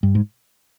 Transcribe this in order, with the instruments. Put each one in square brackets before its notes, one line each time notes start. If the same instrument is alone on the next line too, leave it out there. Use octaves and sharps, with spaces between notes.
[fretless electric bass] G2
G#2